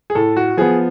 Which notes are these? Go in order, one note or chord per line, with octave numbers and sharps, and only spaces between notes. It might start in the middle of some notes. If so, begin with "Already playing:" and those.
G#4
A2 A4
F#4
F3 B3 G#4